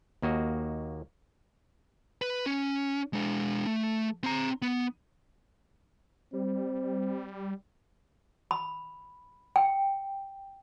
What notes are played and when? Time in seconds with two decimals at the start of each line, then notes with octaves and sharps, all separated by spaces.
0.22 D#2 A#3 F#4 D#5
2.22 B4
2.46 C#4
3.13 G#3 D4
3.67 A3
4.23 C4 A#5
4.62 B3
6.33 G3 C4
8.51 B5
9.56 G5